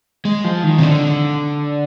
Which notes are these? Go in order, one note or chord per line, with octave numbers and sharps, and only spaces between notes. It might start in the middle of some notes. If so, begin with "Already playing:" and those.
G#3
F3
D#3
C3
D3